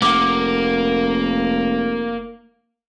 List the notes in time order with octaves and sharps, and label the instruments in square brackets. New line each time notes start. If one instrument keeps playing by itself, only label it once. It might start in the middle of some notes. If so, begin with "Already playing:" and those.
[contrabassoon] F1 [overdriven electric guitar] A#3 [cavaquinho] F#5 D6